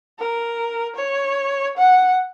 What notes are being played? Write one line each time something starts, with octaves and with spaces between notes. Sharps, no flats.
A#4
C#5
F#5